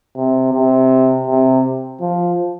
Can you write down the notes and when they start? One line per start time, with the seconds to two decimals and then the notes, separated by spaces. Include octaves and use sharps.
0.17 C3
0.53 C3
1.28 C3
2.01 F3